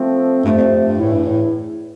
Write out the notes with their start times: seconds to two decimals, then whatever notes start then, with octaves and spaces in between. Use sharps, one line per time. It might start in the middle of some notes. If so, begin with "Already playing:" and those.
Already playing: F3 A3 C4
0.44 G2 C3 F3 A3
0.57 F2
0.86 G2
0.99 E2 A2 E3 A3 E4
1.13 G2
1.27 A2